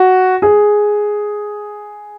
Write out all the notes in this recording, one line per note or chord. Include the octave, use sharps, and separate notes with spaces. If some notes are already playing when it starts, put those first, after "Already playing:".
Already playing: F#4
G#4